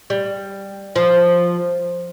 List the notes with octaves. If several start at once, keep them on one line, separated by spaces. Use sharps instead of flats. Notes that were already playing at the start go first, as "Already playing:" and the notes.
G3
F3